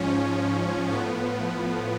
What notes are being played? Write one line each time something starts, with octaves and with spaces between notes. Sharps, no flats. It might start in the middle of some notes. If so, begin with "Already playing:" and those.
Already playing: G#2 F3 C#4
C#4
A2 F3 B3